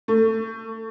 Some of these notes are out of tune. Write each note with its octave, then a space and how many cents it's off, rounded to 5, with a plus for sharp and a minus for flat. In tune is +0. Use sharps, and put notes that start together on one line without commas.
A3 +25